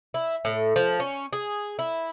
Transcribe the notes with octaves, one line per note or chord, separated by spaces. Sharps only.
E4
A2
F3
C#4
G#4
E4